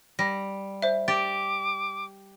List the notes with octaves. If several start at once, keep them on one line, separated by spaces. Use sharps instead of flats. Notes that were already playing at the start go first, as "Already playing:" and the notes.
G3 A#6
C5 E5
G4 D6 A6